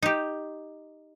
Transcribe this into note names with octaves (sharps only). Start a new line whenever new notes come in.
D#4 G4